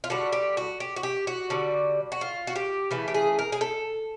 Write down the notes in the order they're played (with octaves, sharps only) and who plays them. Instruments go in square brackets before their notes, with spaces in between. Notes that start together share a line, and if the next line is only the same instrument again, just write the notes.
[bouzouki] F4
D3 G3 F#4
G4
F#4
G4
F#4
G4
F#4
D3 G3
F#4
F4
F#4
G4
C#3 E3 A3
G4
G#4
A#4
G#4
A4